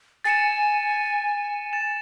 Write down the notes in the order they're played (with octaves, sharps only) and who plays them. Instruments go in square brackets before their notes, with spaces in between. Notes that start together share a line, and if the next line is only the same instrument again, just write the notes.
[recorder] G#5 [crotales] A6 C#7 E7
[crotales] A6 C#7 E7